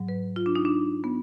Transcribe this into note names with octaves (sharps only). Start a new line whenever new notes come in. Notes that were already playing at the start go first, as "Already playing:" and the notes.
Already playing: G#2 F#3
B4
F4
D4
D#4
D4
B3